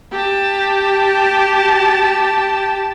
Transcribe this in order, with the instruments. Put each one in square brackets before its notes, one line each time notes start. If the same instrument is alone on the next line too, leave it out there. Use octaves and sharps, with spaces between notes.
[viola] G4 A5